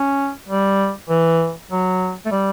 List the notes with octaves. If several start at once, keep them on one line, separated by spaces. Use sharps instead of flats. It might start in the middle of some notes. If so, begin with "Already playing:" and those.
Already playing: C#4
G3
E3
F#3
A3
G3